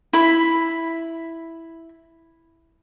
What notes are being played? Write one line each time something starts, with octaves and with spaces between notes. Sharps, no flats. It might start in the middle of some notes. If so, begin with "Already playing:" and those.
E4 B5